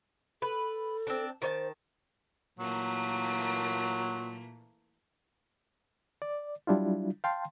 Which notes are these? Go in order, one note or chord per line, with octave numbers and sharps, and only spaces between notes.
A4 B4
C4 D4
D#3 C5 C#5 A5
A#2 E3 F#3 A3 A#3
D5
F#3 G3 D4 E4 F4
F5 G5 A5 C6